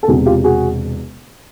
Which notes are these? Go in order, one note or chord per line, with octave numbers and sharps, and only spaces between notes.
A4
E1 E2 C3 F#4 G#4
F4 G4
F#4 G#4